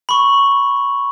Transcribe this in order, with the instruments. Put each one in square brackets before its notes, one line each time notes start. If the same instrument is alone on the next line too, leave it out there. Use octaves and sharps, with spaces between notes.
[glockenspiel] B5 C#6